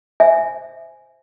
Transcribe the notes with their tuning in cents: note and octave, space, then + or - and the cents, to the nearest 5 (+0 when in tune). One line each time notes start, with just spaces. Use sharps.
C5 +0 E5 +0 G#5 +5